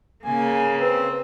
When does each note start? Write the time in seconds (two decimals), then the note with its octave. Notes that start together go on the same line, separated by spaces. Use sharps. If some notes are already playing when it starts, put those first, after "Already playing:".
0.24 C#3 A#3 G#5
0.80 C4 B4